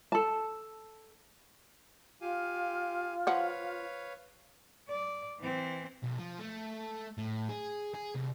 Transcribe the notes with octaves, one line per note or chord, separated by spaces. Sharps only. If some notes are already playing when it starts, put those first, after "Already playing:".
A4 A5
F4 G4 F5 G#5
F3 B4 C#5 F5 F#5
D5
E3 C4
B1
F3
A3
A2
G#4
G#4
C2